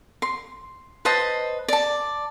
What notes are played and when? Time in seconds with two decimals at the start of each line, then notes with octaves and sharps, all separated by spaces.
0.22 C6
1.05 B4 C5 D#5 A5
1.68 D5 A5